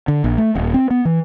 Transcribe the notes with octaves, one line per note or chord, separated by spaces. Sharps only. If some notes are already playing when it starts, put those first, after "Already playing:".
D3
A#1
A3
D#1
C4
B3
E3